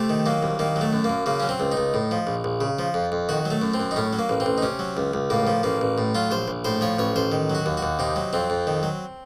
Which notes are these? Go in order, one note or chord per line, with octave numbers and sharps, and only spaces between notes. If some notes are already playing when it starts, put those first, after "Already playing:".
Already playing: C3 A3
D#3
F#3 A#3
C2
D#3 A#3
F#3
A3
F#2
A#3
F#2
C#3 A#3
F#3 C#4
C4
C#2
D#4
C#2
A2
F3
A#1
A#1
C#3
F3
F2
F2
D#3 F#4
F#3
A3
F#2
C4
F#2
D#4
A2 C#4
F#3
A#3
A1
C4
A1
D#4
C3 C#4
F#3
C#2
C#2
A2 A#3
F3
A1 A#3
A1
A2
F#3 F4
A#1 C5
A#1
A2 C5
F3 C#5
A1 C#5
A1 C5
D#3
F#3
F#4
D#2
F#4
D#2
C3 D#4
F#3
F2 C4
F2
D#3
F#3